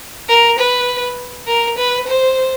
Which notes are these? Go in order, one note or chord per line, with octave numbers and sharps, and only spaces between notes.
A#4
B4
A#4
B4
C5